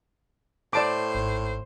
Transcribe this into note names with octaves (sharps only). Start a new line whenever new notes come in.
A2 C5 D5 A5 D6
G#1